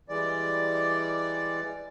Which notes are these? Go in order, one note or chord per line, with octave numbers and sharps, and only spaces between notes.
E3 G3 G#3 D5